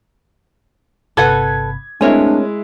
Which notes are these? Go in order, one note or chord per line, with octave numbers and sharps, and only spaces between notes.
G1 C3 A4 B4 F#5 B5 G#6
G#3 A3 C4 D4 E4 A#4 C#5 G#5